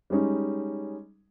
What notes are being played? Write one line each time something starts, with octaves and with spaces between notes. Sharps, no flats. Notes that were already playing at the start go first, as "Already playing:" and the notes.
G3 G#3 C#4 D#4